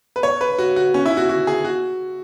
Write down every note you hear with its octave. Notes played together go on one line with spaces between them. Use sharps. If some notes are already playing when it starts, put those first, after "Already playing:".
B4
C#5
B4
F#4
F#4
C#4
E4
F#4
F#4
G#4
F#4